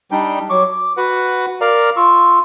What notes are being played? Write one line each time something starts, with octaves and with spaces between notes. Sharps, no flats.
G3 D4 D#4 G5
F#3 C#6 D6
D6
F#4 B4 F#5
A#4 D5 F5 A#5
F4 C#6 E6